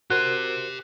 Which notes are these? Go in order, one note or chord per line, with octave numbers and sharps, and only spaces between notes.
F#4 G4 A#4 C5 C6 F#6